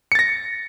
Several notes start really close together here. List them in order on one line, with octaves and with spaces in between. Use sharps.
C#7 A6 A#6